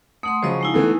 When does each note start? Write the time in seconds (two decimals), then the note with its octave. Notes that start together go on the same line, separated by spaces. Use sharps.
0.23 A3 F#5 C6 D#6
0.43 C#3 F3 F#3 C5 D#5 C#6
0.61 G#3 D#4 E4
0.74 E3 A3 B3